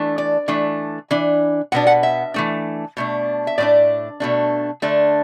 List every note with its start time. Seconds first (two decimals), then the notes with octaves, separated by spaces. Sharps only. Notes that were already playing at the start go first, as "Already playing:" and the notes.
Already playing: E3 A3 D4
0.18 D5
0.48 E3 A3 D4
1.11 E3 D4
1.72 B2 B3 D4 F#5
1.87 F#5
2.03 E5
2.34 E3 A3 D4
2.97 B2 A3 D4
3.47 E5
3.58 A2 A3 D4 D5
4.20 B2 A3 D4
4.82 D3 A3 D4